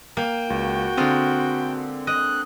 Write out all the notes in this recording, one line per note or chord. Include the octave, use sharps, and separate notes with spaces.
A#3 G5
C#2 F#4
D3 G#3 C4 F4 A#4
D#5 F#6